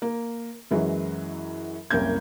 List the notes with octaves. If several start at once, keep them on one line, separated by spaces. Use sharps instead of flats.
A#3
F#2 E3 F#3 G#3
F#1 C2 A#3 C#4 G6 G#6